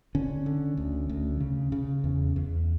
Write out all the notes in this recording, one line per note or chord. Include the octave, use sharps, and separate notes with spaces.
D3 C#4
D3
D2
D2
C#3
C#3
E2
E2